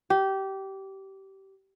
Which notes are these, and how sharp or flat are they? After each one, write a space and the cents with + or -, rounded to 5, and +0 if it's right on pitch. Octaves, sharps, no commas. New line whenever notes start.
G4 -20